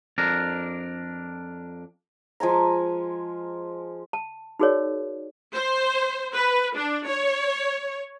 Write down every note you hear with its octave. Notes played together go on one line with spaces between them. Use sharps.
F2 D4 A#4
F3 G#3 G#5 A#5
A5
D#4 F#4 G#4 A#4 C#5 D5
C5
B4
D4
C#5